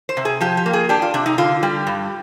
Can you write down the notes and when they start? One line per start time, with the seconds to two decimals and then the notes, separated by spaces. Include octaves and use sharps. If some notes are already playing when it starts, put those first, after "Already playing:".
0.09 C5
0.17 C3
0.25 G#4
0.41 F3 G4
0.57 G4
0.66 A#3
0.73 G#4
0.89 D4 G4
1.02 F4
1.14 C3 D4
1.26 D#4
1.38 D3 F4
1.63 G3 G4
1.87 G2